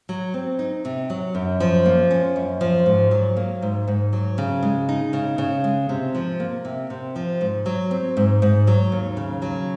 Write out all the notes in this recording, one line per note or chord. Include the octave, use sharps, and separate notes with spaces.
F#3
C4
D#4
C3
F#3
F#2
F3
A#3
C#4
F#2
F3
G#2
F#3
A#3
G#2
G#2
F#3
C#3
G#3
D#4
C#3
C#3
G#3
C3
F3
A#3
C3
C3
F3
G#2
F#3
C4
G#2
G#2
F#3
D#2
C#3
F#3